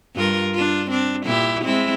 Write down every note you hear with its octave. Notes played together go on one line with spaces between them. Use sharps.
G2 F4 A#4
D4 F4
C4 D4
A#2 E4 G4
G#3 C4 E4